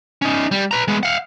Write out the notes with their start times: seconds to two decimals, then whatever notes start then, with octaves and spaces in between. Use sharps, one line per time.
0.22 C#4 D#4
0.51 G3
0.71 B4 A#5
0.88 G#3 B3
1.03 F5 F#5